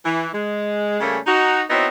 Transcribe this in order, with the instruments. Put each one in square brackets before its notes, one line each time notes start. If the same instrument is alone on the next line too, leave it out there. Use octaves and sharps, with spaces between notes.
[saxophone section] E3
G#3
C#3 G3 A3 A#3 C#4
D#4 F#4
B3 C4 D#4 E4 F#4 C#5